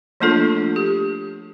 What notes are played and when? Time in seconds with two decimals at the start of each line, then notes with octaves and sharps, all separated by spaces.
0.21 F3 A3 A#3 D4 F4 A4
0.76 G4